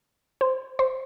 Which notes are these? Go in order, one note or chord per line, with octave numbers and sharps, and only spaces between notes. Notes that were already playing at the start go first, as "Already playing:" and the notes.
C5
C5